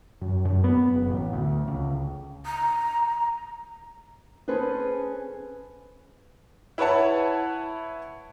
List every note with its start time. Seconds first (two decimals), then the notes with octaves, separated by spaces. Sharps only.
0.21 F#2
0.45 F#2
0.64 B3
0.94 F#1
1.10 A1
1.33 D2
1.68 C#2
2.46 A#5
4.48 C#4 G#4 A4 B4 C5
6.78 E4 B4 C#5 F#5 A5